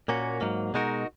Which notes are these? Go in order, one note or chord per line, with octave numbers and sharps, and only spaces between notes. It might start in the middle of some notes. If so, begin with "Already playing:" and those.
A#2 A#3 C#4 F#4
G#2 F#3 A#3
B2 G#3 D#4 F#4 A#4